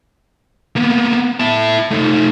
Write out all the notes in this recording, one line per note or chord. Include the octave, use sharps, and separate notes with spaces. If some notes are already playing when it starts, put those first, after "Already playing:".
A#3 B3
E4 A5
A3 D#4